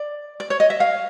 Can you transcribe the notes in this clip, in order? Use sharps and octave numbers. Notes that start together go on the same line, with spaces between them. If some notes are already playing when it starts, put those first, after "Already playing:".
Already playing: D5
D5
C#5
D#5
E5
F5